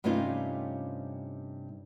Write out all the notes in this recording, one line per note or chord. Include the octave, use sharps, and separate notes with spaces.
G2 C3 A3 C#4 D#4 F4